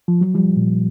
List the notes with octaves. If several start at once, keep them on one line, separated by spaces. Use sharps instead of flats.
F3
F#3
F3 G3
A#2